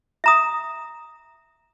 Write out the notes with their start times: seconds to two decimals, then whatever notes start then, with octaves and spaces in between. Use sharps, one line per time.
0.24 E5 A#5 D#6